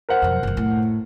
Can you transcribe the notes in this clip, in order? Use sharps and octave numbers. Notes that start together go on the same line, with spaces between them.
A#4 C5 F#5
B1 F2
F#1 C#2
A2